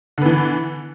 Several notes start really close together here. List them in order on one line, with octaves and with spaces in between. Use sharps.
D3 B3 E3